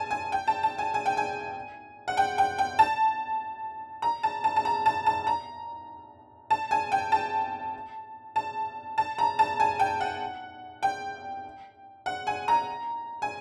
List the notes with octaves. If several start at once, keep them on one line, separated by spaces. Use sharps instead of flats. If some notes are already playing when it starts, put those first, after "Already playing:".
Already playing: G#5 A5
G#5
G5
A5
A5
G#5
G#5
G5
G#5
F#5
G5
G5
G5
A5
A#5
A5
A5
A5
A#5
A5
A5
A#5
A5
G#5
G5
A5
A5
A5
A#5
A5
G#5
G5
F#5
G5
F#5
G#5
A#5
G#5